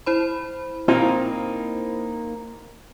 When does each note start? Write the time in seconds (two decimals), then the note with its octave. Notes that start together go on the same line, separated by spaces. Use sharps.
0.06 E4 C5 B5
0.88 A#2 A#3 C4 D#4 F4